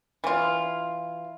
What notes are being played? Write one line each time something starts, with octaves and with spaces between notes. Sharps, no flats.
E3 F4